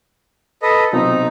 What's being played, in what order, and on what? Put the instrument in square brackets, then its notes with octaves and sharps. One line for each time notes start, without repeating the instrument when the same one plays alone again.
[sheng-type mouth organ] A4 B4 D#5
[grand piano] B1 C3 C4 [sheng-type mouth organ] D#4